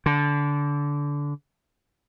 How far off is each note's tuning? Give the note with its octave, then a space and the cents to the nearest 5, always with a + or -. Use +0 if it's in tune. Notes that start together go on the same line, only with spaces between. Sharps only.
D3 -20